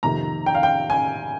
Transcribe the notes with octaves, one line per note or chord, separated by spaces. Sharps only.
F2 C3 D#3 A#3 A#5
G5
F5
G5
G#5